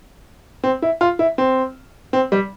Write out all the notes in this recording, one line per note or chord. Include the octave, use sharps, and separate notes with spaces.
C4
E4
F4
E4
C4
C4
G3